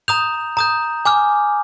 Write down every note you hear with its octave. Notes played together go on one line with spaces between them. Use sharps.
A#5 D#6 G6 F7
A#5 D#6 G6
G#5 D6 F6